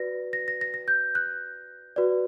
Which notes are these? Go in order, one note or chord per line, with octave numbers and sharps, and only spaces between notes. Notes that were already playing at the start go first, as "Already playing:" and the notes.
Already playing: F#4 B4 D5 A#6
A#6
A#6
A#6
A#6
G6
F#6
F#4 B4 D5